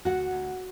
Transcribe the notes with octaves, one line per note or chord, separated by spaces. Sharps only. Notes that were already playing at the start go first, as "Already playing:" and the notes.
D2 F#4 F#5
D2